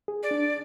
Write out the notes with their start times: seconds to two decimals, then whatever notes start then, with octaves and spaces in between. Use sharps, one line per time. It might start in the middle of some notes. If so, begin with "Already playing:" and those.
0.08 G#4
0.23 D5
0.31 D4